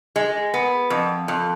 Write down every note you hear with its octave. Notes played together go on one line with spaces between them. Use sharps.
G#3
B3
F2
F2